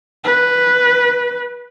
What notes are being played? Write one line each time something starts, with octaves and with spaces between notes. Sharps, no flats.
B4